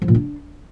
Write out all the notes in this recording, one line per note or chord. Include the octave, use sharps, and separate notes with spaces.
F3
A#2
D4